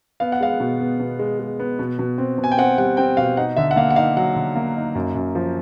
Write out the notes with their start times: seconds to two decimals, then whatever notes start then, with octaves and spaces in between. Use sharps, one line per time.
0.20 B3 F5
0.32 F#5
0.40 G#3 F5
0.60 B2
0.80 B3
1.00 B2
1.19 G#3
1.40 G#3
1.59 B3
1.79 B2
1.99 B2
2.18 C4
2.38 B2
2.44 G#5
2.51 G5
2.58 C4 F#5
2.78 G3 F#5
2.97 C4 G5
3.17 B2 F5
3.37 D#4 F#5
3.57 D3 E5
3.71 F#5
3.76 A#3 F5
3.90 F#5
3.96 D#4 F5
4.17 F#3 F#5
4.36 D3
4.56 A#3
4.76 D#4
4.95 F#2
5.15 F#2
5.35 F3